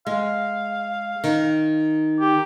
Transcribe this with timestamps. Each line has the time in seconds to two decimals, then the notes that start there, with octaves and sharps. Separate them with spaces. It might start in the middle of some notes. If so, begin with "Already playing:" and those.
0.07 G#3 F5
1.24 D#3
2.20 G4